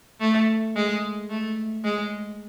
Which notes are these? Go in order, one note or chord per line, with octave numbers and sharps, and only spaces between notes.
A3
G#3
A3
G#3